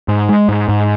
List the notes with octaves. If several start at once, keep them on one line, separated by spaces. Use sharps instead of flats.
G#2
G#3
G#2
G#2